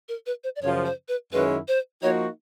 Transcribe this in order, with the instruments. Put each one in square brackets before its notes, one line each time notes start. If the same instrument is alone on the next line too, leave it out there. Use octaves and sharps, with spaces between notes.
[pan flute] A#4
B4
C5
D5
[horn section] F#2 C#3 F3 [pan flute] C#5
[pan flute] C5
B4
[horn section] F#2 D#3 G#3 C#4 E4 [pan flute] B4
[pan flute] C5
[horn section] F3 A#3 D#4 F#4 [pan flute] C#5